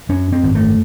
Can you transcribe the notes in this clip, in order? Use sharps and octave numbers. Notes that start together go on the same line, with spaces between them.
F#2 C#4
C4
G#1
A3